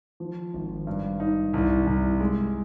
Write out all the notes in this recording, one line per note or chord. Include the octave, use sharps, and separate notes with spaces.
F3
G#1
G2
D#4
C2
C2
G#3